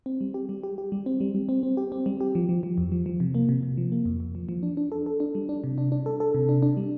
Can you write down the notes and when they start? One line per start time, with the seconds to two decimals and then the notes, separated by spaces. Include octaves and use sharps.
0.06 C4
0.21 G3
0.34 G4
0.49 G3
0.63 G4
0.78 G4
0.92 G3
1.06 C4
1.21 G3
1.35 G3
1.49 C4
1.63 C4
1.77 G4
1.92 C4
2.06 G3
2.21 G4
2.35 F3
2.49 F3
2.63 F3
2.78 F2
2.92 F3
3.06 F3
3.20 C3
3.34 A#3
3.49 C3
3.63 C3
3.77 F3
3.92 A#3
4.05 F2
4.20 F2
4.35 F3
4.49 F3
4.63 D4
4.77 D4
4.92 A4
5.06 A4
5.20 D4
5.35 G3
5.49 D4
5.64 C3
5.78 D4
5.92 D4
6.06 A4
6.20 A4
6.35 C3
6.49 D4
6.62 D4
6.77 G3